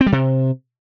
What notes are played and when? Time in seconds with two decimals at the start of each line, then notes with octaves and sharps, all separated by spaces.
0.01 C4
0.06 G3
0.12 C3